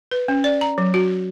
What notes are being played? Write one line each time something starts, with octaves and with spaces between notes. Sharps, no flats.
B4
C#4
D5
A#5
F#3
F#4